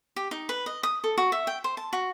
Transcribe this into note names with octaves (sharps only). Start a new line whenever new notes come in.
G4
D#4
B4
D#5
D#6
A4
F#4
E5
G5
C5
A5
F#4